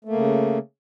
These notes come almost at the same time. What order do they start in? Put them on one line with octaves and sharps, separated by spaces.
A3 A#3 C#3